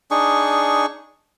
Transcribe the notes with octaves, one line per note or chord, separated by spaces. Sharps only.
D4 D#4 G#4 C#6